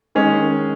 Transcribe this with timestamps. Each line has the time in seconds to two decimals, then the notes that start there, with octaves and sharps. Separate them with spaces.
0.15 D#3 G#3 C#4 G#4